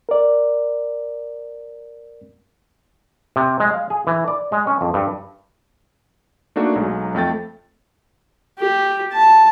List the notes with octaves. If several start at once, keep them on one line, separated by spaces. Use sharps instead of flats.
A#4 D5
C3
G#3
F5
G#4
E3
D5
G#3
C#4
F2
G2
A3 A#3 D4 D#4 F#4
B1 F#3 G#3
F2 A3 G5 A6
G4
A5